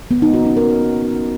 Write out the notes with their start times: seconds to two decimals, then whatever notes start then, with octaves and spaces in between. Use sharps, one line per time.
0.11 B3
0.22 D#4
0.34 F#4
0.45 C#4
0.57 A#4